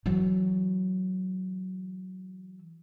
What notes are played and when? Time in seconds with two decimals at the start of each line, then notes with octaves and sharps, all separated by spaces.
0.06 E3 F#3